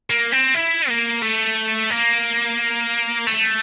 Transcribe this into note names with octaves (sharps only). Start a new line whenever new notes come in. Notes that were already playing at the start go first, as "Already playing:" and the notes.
A#3
C4
E4
A#3
A3
A#3
A3